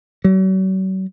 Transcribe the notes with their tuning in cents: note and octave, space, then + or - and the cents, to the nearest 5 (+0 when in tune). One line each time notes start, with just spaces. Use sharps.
F#3 +40